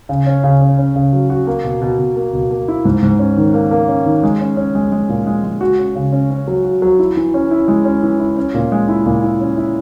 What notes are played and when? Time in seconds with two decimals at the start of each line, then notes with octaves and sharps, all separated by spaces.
0.09 C#3
0.26 C#4
0.44 C#3
0.61 C#4
0.78 C#4
0.96 C#3
1.13 F#3
1.30 F#4
1.47 A#3
1.64 B2
1.81 B2
1.99 B2
2.16 A#3
2.33 B2
2.51 A#3
2.68 E4
2.85 G#2
3.02 G#2
3.19 C#4
3.37 D#3
3.54 A#3
3.71 A#3
3.88 C#4
4.06 D#3
4.23 G#3
4.41 C#4
4.57 C#4
4.75 G#3
4.92 G#3
5.09 A#2
5.27 G#3
5.44 G#3
5.61 F#4
5.79 C#4
5.95 C#3
6.12 C#4
6.30 C#4
6.48 F#3
6.65 F#4
6.82 F#3
6.99 E4
7.16 E3
7.34 C#4
7.51 E4
7.68 G#3
7.85 C#4
8.03 E3
8.20 E4
8.37 C#4
8.54 A#2
8.72 G#3
8.89 E4
9.06 A#2
9.24 E4
9.40 C#4
9.57 E4